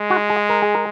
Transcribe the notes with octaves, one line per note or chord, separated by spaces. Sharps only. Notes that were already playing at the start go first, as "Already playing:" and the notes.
Already playing: G#3
F#4
G#4
A#4
G#4
A#4